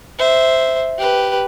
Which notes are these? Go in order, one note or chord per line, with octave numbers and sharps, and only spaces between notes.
C5 E5
G4 B4